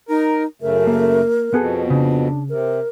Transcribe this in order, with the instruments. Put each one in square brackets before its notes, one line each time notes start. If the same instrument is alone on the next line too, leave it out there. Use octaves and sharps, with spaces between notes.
[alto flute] D#4 [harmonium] A#4
[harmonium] F#2 C#3 A3 [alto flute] A#4
[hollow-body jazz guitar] A#3
[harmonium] F2 B2 [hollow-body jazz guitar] B3 G#4 A4
[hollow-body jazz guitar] C#3 [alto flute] D4
[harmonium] C3 [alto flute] A#4